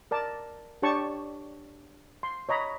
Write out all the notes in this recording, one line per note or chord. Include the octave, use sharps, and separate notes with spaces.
A#4 D5 A5
D4 G4 C#5 A5 C#6
C6
C#5 D#5 A#5 B5